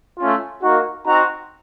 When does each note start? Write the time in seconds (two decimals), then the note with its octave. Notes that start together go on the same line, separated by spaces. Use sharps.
0.18 A3 C#4 F4
0.62 A#3 D#4 F#4
1.06 C4 D#4 F#4 A#5